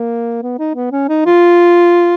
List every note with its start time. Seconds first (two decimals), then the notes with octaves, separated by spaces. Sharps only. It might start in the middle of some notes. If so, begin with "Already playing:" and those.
Already playing: A#3
0.43 B3
0.59 D#4
0.76 B3
0.92 C#4
1.08 D#4
1.26 F4